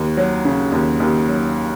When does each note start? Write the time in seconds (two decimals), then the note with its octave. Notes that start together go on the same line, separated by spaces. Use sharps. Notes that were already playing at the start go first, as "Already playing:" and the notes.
Already playing: D#2
0.17 F#3
0.45 C#3
0.72 D#2
1.00 D#2
1.28 F#3